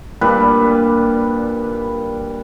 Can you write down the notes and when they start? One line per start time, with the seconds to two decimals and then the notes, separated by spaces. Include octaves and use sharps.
0.21 A#2 G3 D4 B4